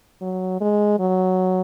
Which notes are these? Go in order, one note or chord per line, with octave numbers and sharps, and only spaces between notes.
F#3
G#3
F#3